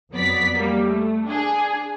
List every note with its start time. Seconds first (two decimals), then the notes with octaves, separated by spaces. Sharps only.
0.12 F2 F#3 B3 D5 B6
0.55 G3 A#3
0.85 A3
1.27 D4 G#4